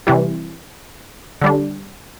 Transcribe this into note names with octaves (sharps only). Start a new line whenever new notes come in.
C3 E3 G3
D3 G3 D4